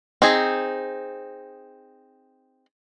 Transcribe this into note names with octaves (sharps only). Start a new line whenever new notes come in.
C4 D#4 G#4